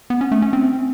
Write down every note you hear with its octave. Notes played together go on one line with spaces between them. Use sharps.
B3
C#4
A3
C#4
C4